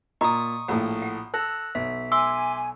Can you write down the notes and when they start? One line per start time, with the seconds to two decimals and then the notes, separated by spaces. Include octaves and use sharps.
0.21 A#2 D#5 A#5 B5 C#6 D#6
0.68 A#1 A2
1.02 F#5
1.34 A4 E6 F#6 A#6
1.75 B1 E5
2.12 E5 G#5 C6 D6 E6